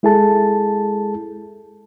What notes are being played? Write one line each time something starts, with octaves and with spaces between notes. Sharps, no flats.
G#3 E4 G#4 A4 A5